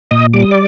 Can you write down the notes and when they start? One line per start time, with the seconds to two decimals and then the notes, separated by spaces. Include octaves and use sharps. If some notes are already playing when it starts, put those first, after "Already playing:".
0.11 A#2 D#5 D#6
0.33 G3 D6
0.42 D#6
0.51 D5 D6